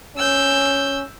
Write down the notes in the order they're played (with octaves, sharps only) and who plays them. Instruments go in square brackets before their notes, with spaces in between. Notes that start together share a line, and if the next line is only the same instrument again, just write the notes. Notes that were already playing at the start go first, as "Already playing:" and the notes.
[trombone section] C#4 [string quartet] E6 G6